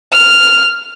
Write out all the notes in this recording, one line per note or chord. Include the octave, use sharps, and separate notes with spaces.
F6